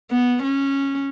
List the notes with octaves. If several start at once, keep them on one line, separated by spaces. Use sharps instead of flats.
B3
C#4